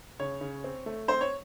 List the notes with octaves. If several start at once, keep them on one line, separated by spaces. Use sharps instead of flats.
C#3 C#5
C#3
C4
A3
C4 C5
C#5